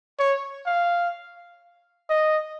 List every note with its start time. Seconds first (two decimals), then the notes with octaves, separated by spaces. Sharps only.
0.19 C#5
0.67 F5
2.10 D#5